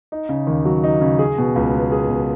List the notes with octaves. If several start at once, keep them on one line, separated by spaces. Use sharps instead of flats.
D#4
C#3
D#2
F#3
D#4
C#3
G#4
B2
C#2
B3
G#4
B2